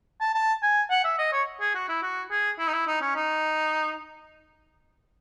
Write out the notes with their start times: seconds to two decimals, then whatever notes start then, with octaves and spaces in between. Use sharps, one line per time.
0.20 A5
0.34 A5
0.62 G#5
0.90 F#5
1.04 E5
1.18 D#5
1.32 C#5
1.60 G#4
1.75 F#4
1.89 E4
2.03 F#4
2.31 G#4
2.59 E4
2.67 D#4
2.73 E4
2.87 D#4
3.01 C#4
3.15 D#4